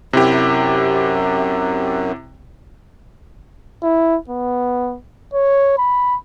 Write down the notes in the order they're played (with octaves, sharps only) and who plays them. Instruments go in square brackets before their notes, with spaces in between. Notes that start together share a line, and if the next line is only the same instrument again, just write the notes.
[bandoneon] F#2 [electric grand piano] C3 E4 G4
[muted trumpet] E4
B3
C#5
B5